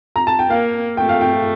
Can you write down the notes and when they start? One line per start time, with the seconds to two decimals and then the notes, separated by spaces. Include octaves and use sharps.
0.16 A#5
0.27 A5
0.39 G5
0.50 A#3 F5
0.97 A3 G5
1.09 F5
1.21 G5